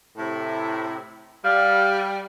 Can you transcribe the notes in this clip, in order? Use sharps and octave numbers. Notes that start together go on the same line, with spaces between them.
A2 C3 E4
G3 F5